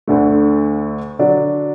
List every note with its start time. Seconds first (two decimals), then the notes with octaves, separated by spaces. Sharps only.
0.08 D2 D3 A3
1.19 D3 F#3 D4